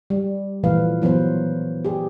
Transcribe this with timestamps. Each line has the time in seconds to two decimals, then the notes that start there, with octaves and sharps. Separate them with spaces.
0.10 G3
0.64 A#2 E3 F3 A3 B4 F5
1.02 E3 F#3 B3 B4 C5
1.85 G4 G#4